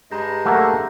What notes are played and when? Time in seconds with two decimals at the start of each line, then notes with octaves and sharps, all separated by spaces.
0.11 G2 G#3 A#5 G6 A#6
0.46 A3 A#3 F#5 E6 F#6